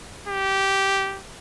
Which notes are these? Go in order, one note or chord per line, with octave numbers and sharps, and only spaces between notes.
G4